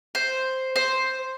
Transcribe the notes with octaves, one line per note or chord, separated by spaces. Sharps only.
C5
C5